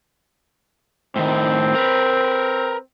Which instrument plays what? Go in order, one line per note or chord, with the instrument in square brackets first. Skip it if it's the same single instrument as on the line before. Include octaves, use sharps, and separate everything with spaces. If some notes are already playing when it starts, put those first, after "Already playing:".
[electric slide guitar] A2 D#3 [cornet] C4
[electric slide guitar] A#4 B4